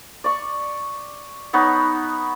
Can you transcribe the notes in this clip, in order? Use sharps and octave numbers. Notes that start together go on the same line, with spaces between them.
D5 C#6
B3 D#4 C#5 B5